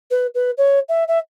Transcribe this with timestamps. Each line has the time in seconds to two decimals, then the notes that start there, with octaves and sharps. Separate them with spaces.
0.11 B4
0.35 B4
0.58 C#5
0.89 E5
1.08 E5